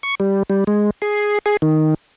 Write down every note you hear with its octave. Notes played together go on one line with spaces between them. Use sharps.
C#6
G3
G3
G#3
G#4
G#4
D#3